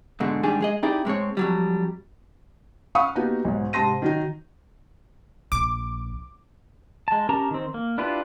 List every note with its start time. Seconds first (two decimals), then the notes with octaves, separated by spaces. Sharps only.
0.20 G#2 B2 D3 G#3
0.43 G#2 D#3 G3 D4 G4 G#4
0.61 G#3 G#4 D#5
0.83 C4 D#4 E4 G4 G#4 D5
1.05 A2 G#3 C4 C#5
1.37 F2 F#3 G3
2.95 F5 F#5 B5 C#6 D#6
3.15 A#3 B3 D#4 F#4 G4
3.45 B1 G#2
3.73 G#2 C3 A5 C6 A#6 D#7
4.02 D#3 F#3 D#4
5.52 A#1 D6
7.08 G#3 A5
7.29 C#4 G4 A#4 A5 A#5
7.51 D#3 C4
7.74 A#3
7.98 D4 E4 F4 G4 B4